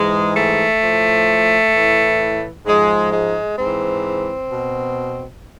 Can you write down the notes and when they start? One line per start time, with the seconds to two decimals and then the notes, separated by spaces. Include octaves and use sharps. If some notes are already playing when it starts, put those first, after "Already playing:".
Already playing: G#2 E3 G#3
0.36 A3
0.81 A2 F3
1.74 A2 E3
2.66 G#2 F3 G#3
3.13 G#3
3.58 G#2 E3 C4
4.50 B2